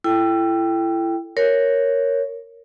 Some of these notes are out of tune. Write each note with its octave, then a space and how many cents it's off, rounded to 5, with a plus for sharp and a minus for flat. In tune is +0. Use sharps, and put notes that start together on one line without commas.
E4 +30 A4 +0 G5 +0
A#4 +0 C#5 +0